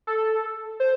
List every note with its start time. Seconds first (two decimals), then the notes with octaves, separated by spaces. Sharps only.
0.07 A4
0.80 C5